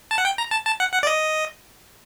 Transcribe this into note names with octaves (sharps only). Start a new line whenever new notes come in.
A5
F#5
G5
A#5
A5
A5
F#5
F#5
D5
D#5